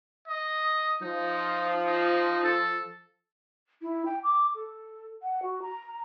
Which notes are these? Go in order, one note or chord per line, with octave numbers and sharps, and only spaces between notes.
D#5
F3 D#4
D#4
A4
E4
G5
D6
A4
F#5
F#4
A#5